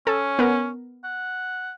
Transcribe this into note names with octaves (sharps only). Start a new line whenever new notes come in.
C#4 A4
B3 A#4
F#5